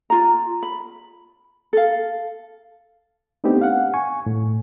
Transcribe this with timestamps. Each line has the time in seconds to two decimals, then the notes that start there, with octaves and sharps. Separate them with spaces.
0.10 F4 A#5
0.63 B5
1.73 A4 F5
3.44 A3 B3 C4 D4 D#4 G4
3.62 F5 F#5
3.94 G#5 C#6
4.26 A2